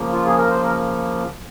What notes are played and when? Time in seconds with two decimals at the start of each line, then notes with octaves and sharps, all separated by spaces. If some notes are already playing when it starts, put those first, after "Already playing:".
Already playing: C#3 F3 A#3
0.13 F4
0.26 G#4
0.38 A#4
0.50 C5
0.63 A#4